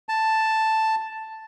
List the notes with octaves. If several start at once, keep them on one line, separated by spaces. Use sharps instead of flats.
A5